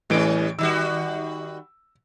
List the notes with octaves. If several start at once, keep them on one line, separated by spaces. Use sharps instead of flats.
A2 E3 G3 C#4 D7
D#3 G3 F#4 E6